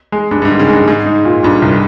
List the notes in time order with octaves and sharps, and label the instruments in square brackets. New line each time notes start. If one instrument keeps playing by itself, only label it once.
[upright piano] G#3
[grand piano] G2 [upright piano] G#3
[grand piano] G2
G#2
[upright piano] D#3
[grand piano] C#3
[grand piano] G2 [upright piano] G#3
[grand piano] G#2 [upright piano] G#3
[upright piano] D#4
A#2
[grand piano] G2 [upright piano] A#2
[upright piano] C2